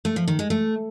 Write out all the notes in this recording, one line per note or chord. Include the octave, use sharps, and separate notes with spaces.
A3
F3
D#3
G#3
A3